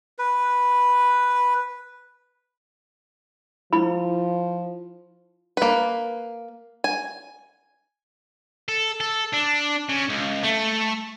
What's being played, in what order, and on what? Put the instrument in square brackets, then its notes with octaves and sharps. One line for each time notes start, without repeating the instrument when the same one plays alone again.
[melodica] B4
[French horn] F3 [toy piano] E4 B5
[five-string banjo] A#3 B4
G#5
[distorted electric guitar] A4
A4
D4
C#3
C#2
A3